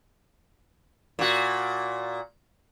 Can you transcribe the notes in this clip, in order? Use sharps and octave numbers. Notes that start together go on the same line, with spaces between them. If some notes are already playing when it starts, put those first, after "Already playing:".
A#2 F#4